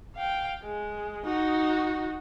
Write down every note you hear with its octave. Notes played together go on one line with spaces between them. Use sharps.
F5 G5
G#3
D#4 F#4